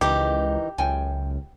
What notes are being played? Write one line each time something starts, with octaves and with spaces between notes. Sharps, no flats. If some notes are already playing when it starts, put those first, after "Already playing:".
C#2 D#3 E3 D#4 G4
C#2 F#2 G5 G#5